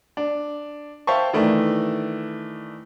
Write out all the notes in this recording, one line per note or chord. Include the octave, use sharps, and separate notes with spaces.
D4
C5 E5 F5 G5 A5 C#6
D#3 E3 A3 D4